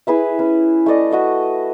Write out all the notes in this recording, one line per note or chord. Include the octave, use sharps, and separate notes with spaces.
E4 G#4 B4 E5
C#4 B4
A3 A4 D5 D#5
F#4 D#5 E5